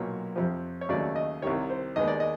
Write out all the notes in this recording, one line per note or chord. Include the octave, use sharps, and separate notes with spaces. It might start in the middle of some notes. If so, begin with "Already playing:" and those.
Already playing: B1 A#2 F#3 C#5
F2 C3 F3
C#5
D#2 C#3 F#3 A3 D5
D#5
C2 C3 D#3 G3 C#5
C5
D#2 D#3 G#3 B3 D#5
D5
D#5